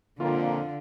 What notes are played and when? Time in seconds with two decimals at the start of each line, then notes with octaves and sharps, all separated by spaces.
0.20 F2 A#2 D3 A#3 F4